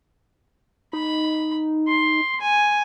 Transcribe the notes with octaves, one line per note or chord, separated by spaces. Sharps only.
D#4 B5
C6
G#5